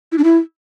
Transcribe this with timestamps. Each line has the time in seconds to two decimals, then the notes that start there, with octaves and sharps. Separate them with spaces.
0.12 E4
0.18 D4
0.24 E4